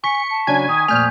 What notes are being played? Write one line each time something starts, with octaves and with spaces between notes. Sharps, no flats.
G#5 C#6 B6 C#7
A5
C#3 F#3 D4 G#5 G#6
D#3 D#6
F2 A#2 A3 G#5 F6 G6